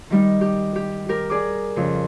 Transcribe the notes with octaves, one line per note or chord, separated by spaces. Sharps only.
D#3 G3 D#4
G4
G4
G4 A#4
G#4 D5 D6
F2 C#3